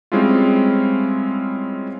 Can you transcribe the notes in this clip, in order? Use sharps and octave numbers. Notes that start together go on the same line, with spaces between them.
G3 G#3 C4 C#4 E4 F4